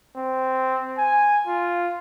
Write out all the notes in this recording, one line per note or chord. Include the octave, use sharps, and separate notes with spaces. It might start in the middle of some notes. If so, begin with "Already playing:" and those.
C4
G#5
F4